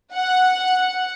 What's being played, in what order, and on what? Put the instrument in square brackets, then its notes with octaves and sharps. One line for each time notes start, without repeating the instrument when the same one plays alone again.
[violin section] F#5